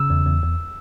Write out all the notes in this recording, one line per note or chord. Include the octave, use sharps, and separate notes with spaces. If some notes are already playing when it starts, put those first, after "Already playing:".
Already playing: C#3 E6
E2
E2
E2